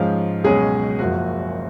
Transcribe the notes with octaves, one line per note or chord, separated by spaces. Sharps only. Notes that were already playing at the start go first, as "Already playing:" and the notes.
Already playing: G#2 F3 G#3 C#4 F4 F5
C#2 B2 F#3 G#3 C#4 G#4
F#1 F#2 F3 F#4